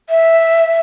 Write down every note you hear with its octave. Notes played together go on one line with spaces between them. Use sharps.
E5